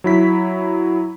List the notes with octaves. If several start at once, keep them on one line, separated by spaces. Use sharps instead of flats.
F#3 E4 B6